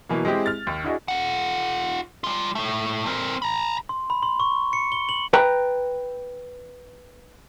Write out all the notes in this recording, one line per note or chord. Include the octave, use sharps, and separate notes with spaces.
B2 E3 F#3 A#3
G#3 C4 E4 G4 G#4
F6 A6
D#2
D4 E4 F#4 G#4 D#5
F4 F#5
G3 F4
A2 A3
C4 A#4
A#5 B5
C6
B5
C6
C#6
C#7
G7
F#7
B4 G5 A#5